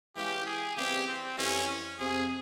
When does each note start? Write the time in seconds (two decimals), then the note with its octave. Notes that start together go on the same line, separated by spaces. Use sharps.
0.16 E3 G#3 C#4 F4 G4
0.46 G#4
0.76 C#3 E3 G3 C4 G4
1.07 C4
1.37 F2 E3 G3 C#4
1.99 F2 C3 F3 G#4